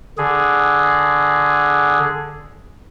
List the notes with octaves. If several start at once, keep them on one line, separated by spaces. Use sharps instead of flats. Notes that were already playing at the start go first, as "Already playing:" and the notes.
D3 G#4